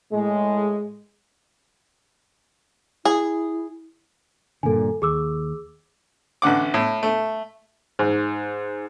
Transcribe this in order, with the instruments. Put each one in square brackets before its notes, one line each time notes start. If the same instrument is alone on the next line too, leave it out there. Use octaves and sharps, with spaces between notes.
[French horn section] A2 G#3
[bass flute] E4 [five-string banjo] G#4
[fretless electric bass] G2 A#2 D3 [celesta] A4 G#5
[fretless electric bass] D#2 [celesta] G#4 D6 E6
[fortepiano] A1 D3 F#5 D6
A2
A3
G#2